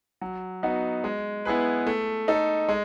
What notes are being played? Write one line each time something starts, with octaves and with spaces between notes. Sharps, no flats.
F#3
B3 D#4 F#4
G#3
B3 E4 G#4 B4
A3
D#4 A4
G#3